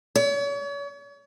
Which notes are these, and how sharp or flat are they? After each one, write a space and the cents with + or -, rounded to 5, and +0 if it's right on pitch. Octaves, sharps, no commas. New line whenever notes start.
C#5 +40